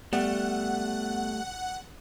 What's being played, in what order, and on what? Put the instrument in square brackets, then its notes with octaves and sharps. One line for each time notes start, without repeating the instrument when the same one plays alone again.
[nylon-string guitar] G3 [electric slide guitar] A3 [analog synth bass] B3 [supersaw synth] F#5